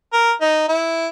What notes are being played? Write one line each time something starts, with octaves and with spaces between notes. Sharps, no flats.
A#4
D#4
E4